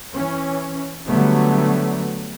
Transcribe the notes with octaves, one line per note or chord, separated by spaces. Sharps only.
E3 C#4
D3 F#3 G3 A3 B3